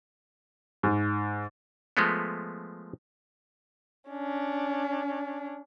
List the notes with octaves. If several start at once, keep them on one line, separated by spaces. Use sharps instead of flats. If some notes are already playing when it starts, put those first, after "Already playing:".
G#2
F3 G#3 A3 B3
C#4 D4